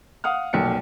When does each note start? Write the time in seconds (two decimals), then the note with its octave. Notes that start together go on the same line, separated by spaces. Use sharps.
0.24 F5 F#5 D#6 F6
0.53 F1 B1 A#3 G5 C#7